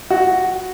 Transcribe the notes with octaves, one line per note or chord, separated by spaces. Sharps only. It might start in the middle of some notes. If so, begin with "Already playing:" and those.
F#4